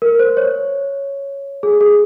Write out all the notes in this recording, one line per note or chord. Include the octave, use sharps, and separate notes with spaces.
A#4
C5
C#5
G#4
G#4